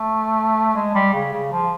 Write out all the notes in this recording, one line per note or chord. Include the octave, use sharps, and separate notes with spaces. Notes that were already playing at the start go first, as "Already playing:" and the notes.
Already playing: A3
G#3
G3
C#3
C#3
F3